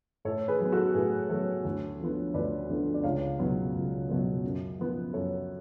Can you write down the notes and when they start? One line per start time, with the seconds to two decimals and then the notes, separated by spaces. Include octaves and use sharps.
0.25 A2 A4 C#5
0.48 G#4 B4
0.61 F#3 B3
0.72 F#4 A4
0.95 A2 G#4 B4
1.29 F#3 B3 A4 C#5
1.65 D2
2.00 D3 F3 B3
2.34 D2 B4 D5
2.70 D3 F3 B3
2.94 D5
3.04 C#2 C#5 F5
3.39 B2 F#3 B3
3.74 C#2
4.09 B2 F#3 B3
4.44 F#2
4.79 F3 B3
5.13 F#2 A4 C#5